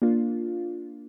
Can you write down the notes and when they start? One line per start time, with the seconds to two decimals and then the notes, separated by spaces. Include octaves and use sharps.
0.02 A#3 D4 F4